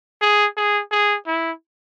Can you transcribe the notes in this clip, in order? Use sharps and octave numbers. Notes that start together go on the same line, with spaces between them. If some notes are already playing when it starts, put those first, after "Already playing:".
G#4
G#4
G#4
E4